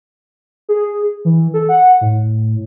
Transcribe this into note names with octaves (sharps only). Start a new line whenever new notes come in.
G#4
E3
A4
F#5
A2